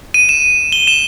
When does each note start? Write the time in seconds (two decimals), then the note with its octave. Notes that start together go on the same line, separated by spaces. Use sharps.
0.14 D#7
0.29 E7
0.72 G7
0.87 E7